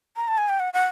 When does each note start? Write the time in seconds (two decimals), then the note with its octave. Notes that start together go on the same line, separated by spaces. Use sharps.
0.16 A#5
0.28 A5
0.38 G#5
0.49 G5
0.60 F#5
0.74 F#5